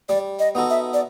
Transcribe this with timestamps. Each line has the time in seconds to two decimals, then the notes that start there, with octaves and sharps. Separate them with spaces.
0.09 G3 D5
0.39 D#5
0.55 B3 D#4 F#4 A4
0.70 E5
0.94 D5